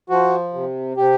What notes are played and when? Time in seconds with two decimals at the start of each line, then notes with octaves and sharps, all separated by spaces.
0.09 F3 F#4
0.54 C3
0.97 C3 G4